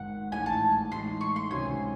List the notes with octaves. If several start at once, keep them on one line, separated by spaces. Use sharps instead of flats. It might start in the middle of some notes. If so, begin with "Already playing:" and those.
Already playing: G#1 G#2 D#3 F#5
A1 A2 G#3 D#4 G#5
A5
A2 E3 G#3 D#4 C6
C#6
C6
C#2 C3 D#3 F#3 C#4 G#5